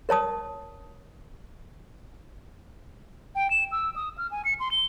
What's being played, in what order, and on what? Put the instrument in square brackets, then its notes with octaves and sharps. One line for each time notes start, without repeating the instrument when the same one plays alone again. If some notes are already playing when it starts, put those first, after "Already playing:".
[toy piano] A#4 C#5 A5 D#6
[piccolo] G5
E7
E6
D#6
F6
G#5
C#7
C6
G7